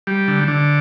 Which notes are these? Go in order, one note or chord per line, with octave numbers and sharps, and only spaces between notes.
G3
D3
D3